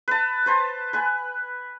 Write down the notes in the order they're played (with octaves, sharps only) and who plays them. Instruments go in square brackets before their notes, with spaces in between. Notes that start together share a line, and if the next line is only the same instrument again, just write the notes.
[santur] B4 A5
B4 C5 A5
B4 G#5